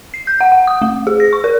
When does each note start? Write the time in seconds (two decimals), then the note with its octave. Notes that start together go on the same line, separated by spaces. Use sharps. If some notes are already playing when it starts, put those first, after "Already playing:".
0.14 C7
0.27 G6
0.41 F#5
0.52 F#5
0.67 D#6
0.82 A3
1.07 G#4
1.20 A#6
1.33 C#6
1.44 A#4